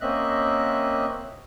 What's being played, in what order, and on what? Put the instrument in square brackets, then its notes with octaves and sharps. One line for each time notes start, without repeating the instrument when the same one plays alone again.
[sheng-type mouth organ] A#3 C4 C#4 D#5 E5 F#6